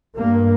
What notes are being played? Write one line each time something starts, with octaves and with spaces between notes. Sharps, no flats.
G2 A#3